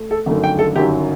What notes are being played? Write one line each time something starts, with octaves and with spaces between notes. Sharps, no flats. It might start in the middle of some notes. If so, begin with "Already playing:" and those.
Already playing: A3
A4
G1 F#2 D#3 A3
G5
A4
G1 F#2 D#3 F#3 G4